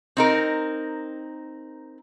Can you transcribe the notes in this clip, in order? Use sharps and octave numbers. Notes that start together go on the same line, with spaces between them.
C4 D#4 A#4